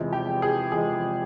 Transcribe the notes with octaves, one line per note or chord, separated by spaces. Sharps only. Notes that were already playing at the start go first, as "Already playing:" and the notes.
Already playing: E2 C3 F3 G#3
G4
G#4
E2 C3 F3 G#3 G#4